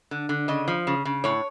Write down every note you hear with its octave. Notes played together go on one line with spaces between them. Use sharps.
D3
D3
C#3 D#5
F3
C#3
C#3
A2 C#5